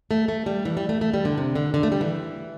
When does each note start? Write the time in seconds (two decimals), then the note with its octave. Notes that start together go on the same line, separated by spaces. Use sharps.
0.11 A3
0.28 A3
0.46 G3
0.65 E3
0.77 G3
0.89 A3
1.01 A3
1.14 G3
1.25 D3
1.37 C3
1.55 D3
1.74 D3
1.83 A3
1.92 G3
2.01 E3